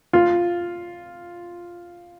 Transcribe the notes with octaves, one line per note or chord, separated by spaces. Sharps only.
F4